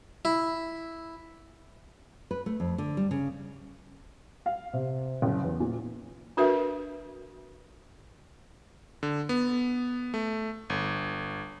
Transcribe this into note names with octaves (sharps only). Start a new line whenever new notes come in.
E4
B4
A3
F2
D3
G3
C#3
F5
C3
F#1
E2
A#2
D4 F#4 A#4 B4 E5
D3
B3
A3
G1